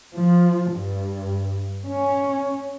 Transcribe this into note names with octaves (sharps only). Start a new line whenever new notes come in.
F3
G2
C#4